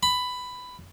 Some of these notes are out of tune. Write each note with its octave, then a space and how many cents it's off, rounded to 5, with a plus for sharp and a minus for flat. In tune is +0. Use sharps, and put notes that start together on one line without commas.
B5 +10